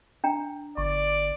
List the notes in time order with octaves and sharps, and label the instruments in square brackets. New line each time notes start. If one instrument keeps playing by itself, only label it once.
[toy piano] D4 G5 A#5
[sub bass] G1 [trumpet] D5 [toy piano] C#6